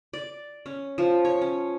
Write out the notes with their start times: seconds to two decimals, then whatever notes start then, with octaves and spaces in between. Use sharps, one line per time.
0.13 D5
0.66 C#4
0.98 F3
1.25 C#5
1.42 C#4